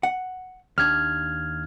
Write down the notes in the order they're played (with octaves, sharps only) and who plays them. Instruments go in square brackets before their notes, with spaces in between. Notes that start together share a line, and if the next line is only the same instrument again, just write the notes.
[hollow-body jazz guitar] F#5
[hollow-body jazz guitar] D#2 D4 [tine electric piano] F6 G#6